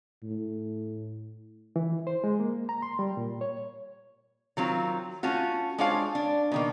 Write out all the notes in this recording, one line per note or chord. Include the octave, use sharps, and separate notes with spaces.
A2
E3
C5
G#3
A#3
A#5
C6
G3
A#2
C#5
D#3 F#3 C4 F4
A3 C#4 F4 F#4
G#3 D4 F4 C5 C#5 F5
D4
B2 D#3 A#3